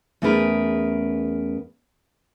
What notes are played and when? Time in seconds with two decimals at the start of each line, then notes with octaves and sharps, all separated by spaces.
0.22 E2 A3 C#4 G#4 A#4 B4